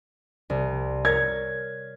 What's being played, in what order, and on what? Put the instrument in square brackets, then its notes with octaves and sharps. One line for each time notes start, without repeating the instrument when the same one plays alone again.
[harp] C2
[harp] A#4 C#5 [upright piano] G#6